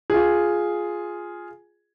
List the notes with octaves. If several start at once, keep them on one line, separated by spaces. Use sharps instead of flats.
F4 G#4